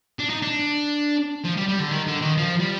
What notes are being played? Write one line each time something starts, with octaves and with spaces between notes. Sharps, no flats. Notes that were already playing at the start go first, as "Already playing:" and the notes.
D4
D#4
D4
F3
G3
G3
D3
D#3
D3
D#3
F3
G3